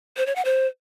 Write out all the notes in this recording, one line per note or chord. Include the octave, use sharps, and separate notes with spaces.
C5
C#5
F#5
C5